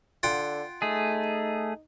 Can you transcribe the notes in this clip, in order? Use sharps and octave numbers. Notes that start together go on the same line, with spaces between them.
D3 F4 F#5 G5
A3 D#4 G#4